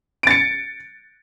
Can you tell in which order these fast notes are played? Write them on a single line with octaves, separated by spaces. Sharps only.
D7 A6 C#7